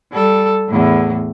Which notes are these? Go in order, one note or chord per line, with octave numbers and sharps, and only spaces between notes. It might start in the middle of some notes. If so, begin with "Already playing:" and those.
G3 A4
E2 A2